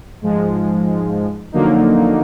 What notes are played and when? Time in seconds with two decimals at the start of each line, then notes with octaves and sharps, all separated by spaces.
0.22 G#2 F3 G#3
1.52 F2 D3 F#3 A#3 D#4